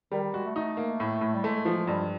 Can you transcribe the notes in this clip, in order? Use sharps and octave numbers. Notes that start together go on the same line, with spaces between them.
D#3 G3
D#3
G#3 F#4
A3
A3 D#4
A#3
A2
A2
G3
G#3 A3
F3
G2